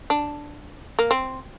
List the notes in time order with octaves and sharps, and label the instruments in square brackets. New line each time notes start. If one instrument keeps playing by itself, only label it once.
[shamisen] D4
A#3
C4